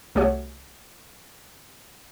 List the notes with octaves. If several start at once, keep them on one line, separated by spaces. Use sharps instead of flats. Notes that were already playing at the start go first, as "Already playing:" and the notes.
C2 A3 F#4 G4 C#5 F#5